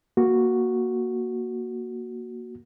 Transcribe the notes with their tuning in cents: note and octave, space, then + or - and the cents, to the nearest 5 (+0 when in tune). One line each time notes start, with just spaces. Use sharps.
A#3 +10 F#4 +0